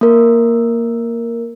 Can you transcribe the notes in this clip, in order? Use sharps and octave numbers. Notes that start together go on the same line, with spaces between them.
A#3 A#4